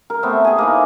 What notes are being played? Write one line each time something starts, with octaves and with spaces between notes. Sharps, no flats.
A#4
A3 B3 C4 E5
G#4 G#5
A#3 D#4 E4